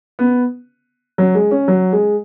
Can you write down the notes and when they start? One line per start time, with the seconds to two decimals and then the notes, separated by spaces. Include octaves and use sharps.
0.19 B3
1.18 F#3
1.35 G#3
1.51 C#4
1.68 F#3
1.93 G#3